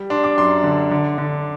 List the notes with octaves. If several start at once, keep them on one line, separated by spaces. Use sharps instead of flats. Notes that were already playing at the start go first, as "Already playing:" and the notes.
Already playing: G3
D4 C6
D6
F#2 C6
D3
D3
D3